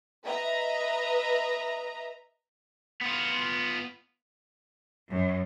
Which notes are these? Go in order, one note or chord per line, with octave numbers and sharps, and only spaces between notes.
B4 D#5 E5 A#5
B3 F4
F#2